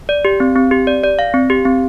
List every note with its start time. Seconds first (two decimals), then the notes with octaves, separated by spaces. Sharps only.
0.09 D5
0.25 G4
0.40 C4
0.56 C4
0.71 G4
0.87 D5
1.04 D5
1.19 F5
1.34 C4
1.50 G4
1.65 C4